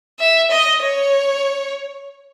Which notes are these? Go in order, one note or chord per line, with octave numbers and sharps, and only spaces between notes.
E5
D#5
C#5